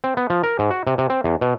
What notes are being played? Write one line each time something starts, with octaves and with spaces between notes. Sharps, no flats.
C4
B3
F3
A#4
G#2
F#4
C3
C3
C4
E2
B2